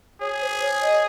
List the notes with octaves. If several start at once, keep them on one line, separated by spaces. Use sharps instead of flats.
G#4 C#5
C5
C#5
D#5